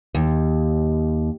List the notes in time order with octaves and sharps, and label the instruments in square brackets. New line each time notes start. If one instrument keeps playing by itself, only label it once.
[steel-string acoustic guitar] D#2